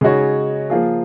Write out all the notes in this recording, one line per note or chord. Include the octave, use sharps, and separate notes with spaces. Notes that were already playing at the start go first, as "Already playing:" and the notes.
C#3 G#3 D#4 F#4 C#5
F3 A#3 F4 G#4